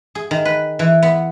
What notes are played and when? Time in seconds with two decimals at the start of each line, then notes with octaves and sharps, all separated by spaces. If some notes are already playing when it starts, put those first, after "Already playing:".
0.15 G#4
0.31 D#3
0.45 B4
0.79 E3
1.03 B3